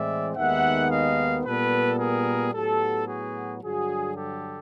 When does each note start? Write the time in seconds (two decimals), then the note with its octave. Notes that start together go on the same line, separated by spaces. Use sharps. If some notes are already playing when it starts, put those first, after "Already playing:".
Already playing: A2 E3 G#3 C4 D5 E5
0.36 D#2 D#3 G#3 B3 E5 F#5
0.90 D#5 F5
1.44 A#2 G3 B3 A4 B4
1.99 G#4 A#4
2.53 A2 F#3 B3 G4 A4
3.08 F#4 G#4
3.62 G2 D3 F#3 F#4 G#4
4.16 G4 A4